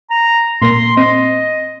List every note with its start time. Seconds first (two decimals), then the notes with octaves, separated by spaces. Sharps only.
0.10 A#5
0.62 A#2 A#3 C6 A#6
0.97 C4 D#5